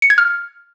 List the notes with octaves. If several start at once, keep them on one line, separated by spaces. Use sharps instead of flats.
C#7
G#6
F6